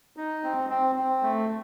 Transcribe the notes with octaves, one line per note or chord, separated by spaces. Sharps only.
D#4
C4
C4
C4
A3